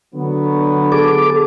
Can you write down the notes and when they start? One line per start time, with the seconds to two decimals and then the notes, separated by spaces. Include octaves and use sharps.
0.15 D3 F#3 B3
0.92 G#4 A4 D6